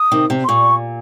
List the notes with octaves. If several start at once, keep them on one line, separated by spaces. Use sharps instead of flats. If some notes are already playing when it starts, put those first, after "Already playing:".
Already playing: D#6
C3 D#3
C3
C6
A#2 C#6